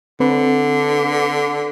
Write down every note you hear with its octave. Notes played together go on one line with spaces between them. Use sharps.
D3 C4 B4